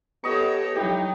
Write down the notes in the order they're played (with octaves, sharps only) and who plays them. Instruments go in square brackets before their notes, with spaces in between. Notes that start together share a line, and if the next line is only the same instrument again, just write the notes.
[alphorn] B3 [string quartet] G4 A4 C#5 [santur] D#5 C#6
[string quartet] F#3 D#4 [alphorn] E4 [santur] G4 G5